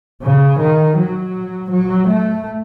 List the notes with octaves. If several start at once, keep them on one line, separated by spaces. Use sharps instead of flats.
C#3
D#3
F#3
F#3
A3